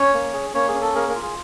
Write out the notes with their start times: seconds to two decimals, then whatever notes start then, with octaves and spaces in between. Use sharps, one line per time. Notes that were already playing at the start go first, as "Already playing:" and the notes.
Already playing: C#4 C#5
0.14 A#3
0.33 G#4
0.54 A#3 C#4 C#5
0.68 G#4
0.74 C#4
0.81 A4
0.95 A#3 G#4 A#4
1.09 A#3 A#4
1.15 F4
1.22 G#4